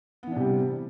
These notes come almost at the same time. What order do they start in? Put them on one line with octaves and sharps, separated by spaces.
B3 E3 D4 C3 G3